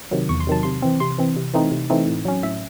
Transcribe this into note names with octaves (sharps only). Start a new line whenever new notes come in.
C3 D#3 F#3
E2 C#6
C6
C3 D#3 F#3 A5
C3 C6
E3 C4
C3 C6
E3 C4
C3
E3 A3 C4 D#4
C3
E3 A3 C4 D#4
A2
F#3 C#4
A2 E5